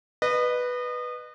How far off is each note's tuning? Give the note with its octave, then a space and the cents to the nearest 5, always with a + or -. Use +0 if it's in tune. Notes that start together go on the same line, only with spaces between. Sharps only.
B4 +0 D#5 -30